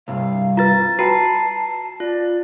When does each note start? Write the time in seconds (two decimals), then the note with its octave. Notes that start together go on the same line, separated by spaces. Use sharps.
0.08 C2 G2 F5
0.57 F4 B4 A#5 A6
0.99 F#4 B4 G5 A5 A#5 C7
2.00 F4 D5